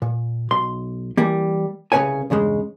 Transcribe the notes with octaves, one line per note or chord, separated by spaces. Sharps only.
A#2
B1 C6
E3 G3 A#3
C2 C#3 G#3 B4 C#5 G#5
E2 G2 C#3 G#3